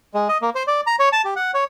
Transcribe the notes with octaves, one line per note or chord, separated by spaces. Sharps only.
G#3
D#5
A#3
C5
D5
A#5
C#5
A5
G4
F#5
C#5